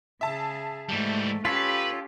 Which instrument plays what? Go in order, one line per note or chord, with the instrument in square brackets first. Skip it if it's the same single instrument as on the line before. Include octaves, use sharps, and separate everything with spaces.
[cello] C#3 G#4 [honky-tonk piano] E5 A5
[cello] G#2 A3 [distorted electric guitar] E3 G3
[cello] C#4 G4 [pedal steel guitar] F4 A4 C#5 [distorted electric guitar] B4 [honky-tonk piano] B6 C7